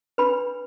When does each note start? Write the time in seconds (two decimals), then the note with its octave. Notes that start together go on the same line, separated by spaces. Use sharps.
0.18 D4 B4 B5